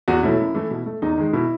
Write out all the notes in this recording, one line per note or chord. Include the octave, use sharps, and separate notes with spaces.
E2 F#4
B2 F#3 A3 E4
F#2
E3 A3
B2
A3
E2 D#4
D#3 G#3
B2 E4